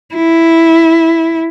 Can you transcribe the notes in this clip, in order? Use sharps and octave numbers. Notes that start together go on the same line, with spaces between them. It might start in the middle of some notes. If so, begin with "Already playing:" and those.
E4